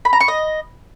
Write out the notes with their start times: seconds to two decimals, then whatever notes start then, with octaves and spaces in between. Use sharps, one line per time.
0.05 B5
0.13 A#5
0.20 C#6
0.28 D#5